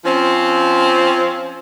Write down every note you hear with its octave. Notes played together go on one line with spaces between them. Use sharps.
F3 C4 C#4